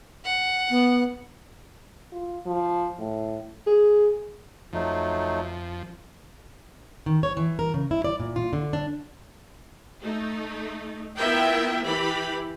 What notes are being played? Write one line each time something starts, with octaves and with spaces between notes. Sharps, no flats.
F#5
B3
F4
F3
A2
G#4
F2 F3 F#3 A3 D#4
D#3
C#5
E3
A#4
C#3
E4
D5
A#2
F4
D3
D4
A3 D#4
B3 E4 F4 A#4 E5 G5
E3 G4 B5